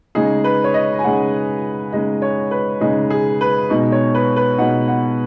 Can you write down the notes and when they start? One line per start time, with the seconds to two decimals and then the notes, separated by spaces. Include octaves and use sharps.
0.15 C#3 G#3 D#4 G#4
0.44 B4
0.64 C#5
0.74 D#5
0.99 G#5
1.04 C#3 G#3 D#4 F#5
1.92 C#3 G#3 D#4 D#5
2.22 C#5
2.51 B4
2.81 C#3 G#3 D#4 G#4
3.10 G#4
3.41 B4
3.70 B2 G#3 D#4
3.92 C#5
4.15 B4
4.36 B4
4.58 B2 G#3 D#4 F#5
4.88 F#5